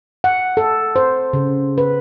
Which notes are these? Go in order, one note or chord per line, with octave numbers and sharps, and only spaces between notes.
F#5
A4
C5
C#3
B4